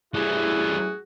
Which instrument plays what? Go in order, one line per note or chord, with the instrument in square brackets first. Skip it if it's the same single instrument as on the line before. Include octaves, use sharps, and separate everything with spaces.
[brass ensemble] A1 E4 G#5 [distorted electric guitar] E3 G3 [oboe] F#4 [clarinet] G#4